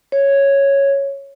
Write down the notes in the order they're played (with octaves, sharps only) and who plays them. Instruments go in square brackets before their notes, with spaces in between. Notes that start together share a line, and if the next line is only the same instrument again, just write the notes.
[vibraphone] C#5